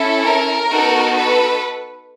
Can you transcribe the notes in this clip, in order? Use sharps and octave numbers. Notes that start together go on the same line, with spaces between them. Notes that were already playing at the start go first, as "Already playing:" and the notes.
Already playing: C#4 E4 A4
A#4
B3 D#4 F#4 A4
A4 B4